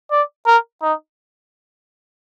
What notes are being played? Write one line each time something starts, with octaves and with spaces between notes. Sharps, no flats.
D5
A#4
D#4